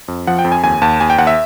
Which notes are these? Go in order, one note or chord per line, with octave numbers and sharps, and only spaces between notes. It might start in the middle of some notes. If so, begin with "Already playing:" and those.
F2
F3 F#5
G5
F2
G#5
D#2 G#5
D#2 A5
D#2 G#5
G5
D#2 F#5
E5